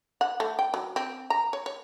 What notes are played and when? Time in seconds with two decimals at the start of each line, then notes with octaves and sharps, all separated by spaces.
0.21 F#5
0.40 A3
0.59 G5
0.74 F#3
0.96 C4
1.30 A#5
1.53 C#5
1.66 C#5